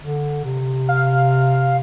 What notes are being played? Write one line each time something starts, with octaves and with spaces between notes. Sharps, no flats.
D3
C3
F5